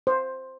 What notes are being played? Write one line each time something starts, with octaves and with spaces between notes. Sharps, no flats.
C5